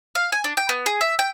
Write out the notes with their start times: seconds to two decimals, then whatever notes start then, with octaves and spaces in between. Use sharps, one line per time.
0.15 F5
0.32 G#5
0.44 D4
0.57 G5
0.69 B3
0.86 G#4
1.01 E5
1.19 G5